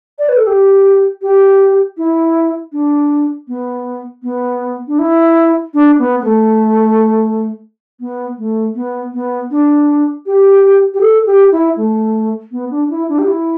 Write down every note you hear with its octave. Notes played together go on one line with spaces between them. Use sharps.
D5
B4
A4
G4
G4
E4
D4
B3
B3
D4
E4
D4
B3
B3
A3
B3
A3
B3
B3
D4
G4
G4
A4
G4
E4
A3
B3
D4
E4
D4
G4
E4